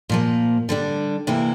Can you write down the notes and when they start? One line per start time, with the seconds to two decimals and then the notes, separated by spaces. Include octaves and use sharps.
0.09 A#2 F3 A#3
0.69 D3 G3 D4
1.27 D2 C3 E3 A#3 E4